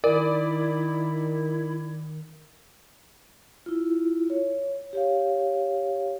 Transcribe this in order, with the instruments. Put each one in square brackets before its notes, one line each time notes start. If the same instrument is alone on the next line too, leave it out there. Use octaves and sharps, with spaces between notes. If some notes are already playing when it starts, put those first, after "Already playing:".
[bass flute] D#3 [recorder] E4 [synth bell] A#4 [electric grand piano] D5
[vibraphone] E4 F4
C#5
G4 C#5 F5